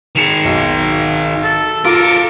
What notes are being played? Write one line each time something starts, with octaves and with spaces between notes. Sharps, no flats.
D#3 G#4 C#7 E7 F7
B1
A4
F4 A4 A#4 D6